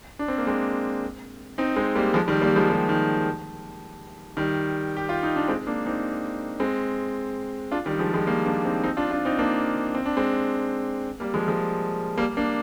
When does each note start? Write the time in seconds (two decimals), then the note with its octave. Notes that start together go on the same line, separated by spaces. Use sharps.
0.19 D4
0.28 C4
0.38 A#3
0.47 G#3 C4
1.58 C4 D#4
1.76 G#3 C4
1.95 G3 A#3
2.14 F3 G#3
2.28 D#3 G3
2.41 G3 A#3
2.56 F3 G#3
2.70 D#3 G3
2.89 D#3
4.37 D#3 G3
4.97 G4
5.09 F4
5.23 D#4
5.36 D4
5.48 G#3 C4
5.67 A#3 D4
5.86 C4 D#4
6.60 G#3 C4
7.71 D4 F4
7.86 D#3 G3
7.99 F3 G#3
8.14 F3 G#3
8.27 G3 A#3
8.46 A#3 D4
8.65 C4 D#4
8.83 C4 D#4
8.97 D4 F4
9.11 D4 F4
9.25 C4 D#4
9.39 A#3 D4
9.95 C4
10.06 D4
10.17 G#3 C4
11.20 G3 A#3
11.34 F3 G#3
11.48 F3 G#3
12.17 G3 A#3
12.37 A#3 D4